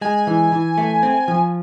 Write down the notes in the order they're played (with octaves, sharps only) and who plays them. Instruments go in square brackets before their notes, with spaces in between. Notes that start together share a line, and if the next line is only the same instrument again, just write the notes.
[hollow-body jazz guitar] G#3 [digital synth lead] G#5
[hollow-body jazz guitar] E3
E3
A3
C4
F3